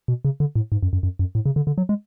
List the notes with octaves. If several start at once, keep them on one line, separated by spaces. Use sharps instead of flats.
B2
C#3
D3
A2
G#2
F#2
F#2
F#2
F#2
A2
C#3
D3
D3
F#3
G#3